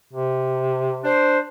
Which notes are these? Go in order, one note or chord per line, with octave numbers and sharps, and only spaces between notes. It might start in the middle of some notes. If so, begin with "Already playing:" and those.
C3
D4 C5